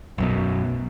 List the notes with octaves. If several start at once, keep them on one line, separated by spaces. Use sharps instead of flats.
B1 F#2 B2